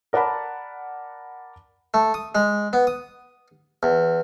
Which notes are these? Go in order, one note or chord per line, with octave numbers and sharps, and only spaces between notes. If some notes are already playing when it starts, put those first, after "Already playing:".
A#4 D5 F#5 A5 B5
A3
D#6
G#3
B3
D#6
E2